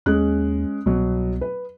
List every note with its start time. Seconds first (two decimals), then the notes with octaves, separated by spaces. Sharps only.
0.06 D#2 G#3 C#4 F#6
0.86 C2 B2 F#3
1.41 B4